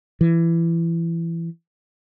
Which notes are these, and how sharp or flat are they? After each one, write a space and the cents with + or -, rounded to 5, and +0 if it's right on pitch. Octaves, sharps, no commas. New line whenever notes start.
E3 +20